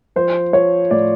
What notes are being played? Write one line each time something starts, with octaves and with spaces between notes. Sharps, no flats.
F3 C5
F3 C#5
A2 D5